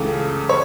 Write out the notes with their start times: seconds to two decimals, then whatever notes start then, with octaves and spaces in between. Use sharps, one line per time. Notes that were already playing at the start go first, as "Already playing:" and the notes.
Already playing: C#2 C#3 E3 A3 A4
0.49 C#5